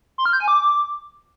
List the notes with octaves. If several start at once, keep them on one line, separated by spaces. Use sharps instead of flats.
C6
F6
G6
G#5
D6